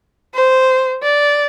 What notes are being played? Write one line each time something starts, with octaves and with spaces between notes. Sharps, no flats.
C5
D5